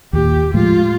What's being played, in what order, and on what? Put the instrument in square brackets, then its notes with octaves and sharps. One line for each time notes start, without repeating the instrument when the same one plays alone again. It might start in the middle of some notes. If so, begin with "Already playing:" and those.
[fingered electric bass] D#2 A#2 [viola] G4
[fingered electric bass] A2 F3 G#3 [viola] F4